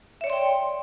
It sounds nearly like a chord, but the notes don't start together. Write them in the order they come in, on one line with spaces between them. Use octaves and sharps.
E5 C#5 D5 C6 G5